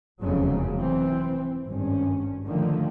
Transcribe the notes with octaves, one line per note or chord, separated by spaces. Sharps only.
F1 E2 G#2 C#3 F#3
E3 C4
G#1 G2 C#4
D3 D#3 F3 A3 A#3